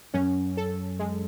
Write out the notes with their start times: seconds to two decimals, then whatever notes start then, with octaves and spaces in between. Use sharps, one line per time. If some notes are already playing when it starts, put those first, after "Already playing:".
0.14 F#2 C#4
0.57 A4
0.99 G#3